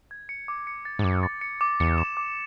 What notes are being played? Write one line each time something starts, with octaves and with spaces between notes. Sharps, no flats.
G#6
C#7
D6
C#7
A6
G#2
F#2 D6
A6
C#7
D6
E2 C#7
E7
D6